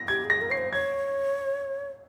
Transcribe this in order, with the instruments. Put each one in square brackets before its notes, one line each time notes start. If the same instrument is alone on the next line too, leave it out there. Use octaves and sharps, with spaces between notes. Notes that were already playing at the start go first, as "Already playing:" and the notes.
Already playing: [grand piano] A#6
[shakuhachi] G4 [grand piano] G#6
[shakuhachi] G#4
[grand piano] A#6
[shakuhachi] A#4
[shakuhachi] C#5 [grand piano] C7
[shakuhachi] C5
[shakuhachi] C#5 [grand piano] G#6